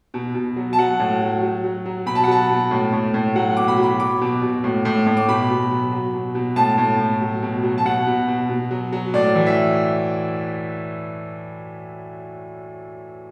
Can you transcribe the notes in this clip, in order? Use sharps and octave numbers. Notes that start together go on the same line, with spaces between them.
B2
B2
F#3
A5
F#3 F#5
A2
F#3
F#3
F#3
F#3
B2 B5
A5
F#5
F#3 A5
B2
A2
A2
A2
F#3 F#5
B2 D6
B5
F#3 B5
F#3 D6
B2
B2
A2
A2
A2
D6
B2 B5
B2
F#3
F#3
B2
B2
A2 A5
A2
A2
F#3
B2
F#3
A5
B2 F#5
B2
B2
B2
F#3
F#3
A2 D5
E3
E5